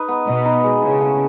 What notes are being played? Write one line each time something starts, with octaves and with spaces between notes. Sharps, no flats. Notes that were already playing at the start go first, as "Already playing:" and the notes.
Already playing: D#4 B4
B3
B2 D#5
D#4
G#3
C#3 E4
A3